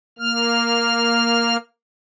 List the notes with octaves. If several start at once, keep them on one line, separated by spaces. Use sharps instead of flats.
A#3 F6